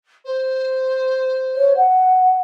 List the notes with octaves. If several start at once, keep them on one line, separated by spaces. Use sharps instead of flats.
C5
C#5
F#5